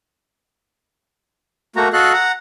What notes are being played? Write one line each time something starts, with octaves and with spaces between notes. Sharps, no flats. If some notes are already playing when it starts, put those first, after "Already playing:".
A3 A#3 F#4 A#5
F#4 A4 D#5 F5 F#6
F#5 A#5